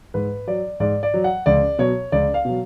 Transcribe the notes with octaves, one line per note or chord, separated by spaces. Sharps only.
G#2 B4
F#3 D5
G#2 D5
D5
F#3
F#5
C#2 D5
B2 F#3 C#5
C#2 D5
F5
B2 F#3